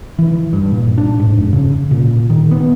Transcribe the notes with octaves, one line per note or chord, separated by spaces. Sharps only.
E3
G2
A#2
D4
G#2
F2
C#3
A#2
D#3
B3